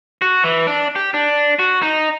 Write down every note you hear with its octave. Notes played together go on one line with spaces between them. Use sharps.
F#4
E3
D4
G4
D4
F#4
D#4